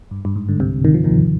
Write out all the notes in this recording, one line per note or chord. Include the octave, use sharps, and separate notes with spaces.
G2
G2
G#2
D3
C2 C3
D#3
F3
D#2 D#3